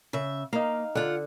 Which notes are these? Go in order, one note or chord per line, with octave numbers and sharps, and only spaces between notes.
C#3 E5
A#3 D#4 F5
D3 F4 F#5